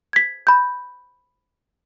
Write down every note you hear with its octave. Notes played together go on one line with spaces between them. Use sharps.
G#6 B6
B5 G6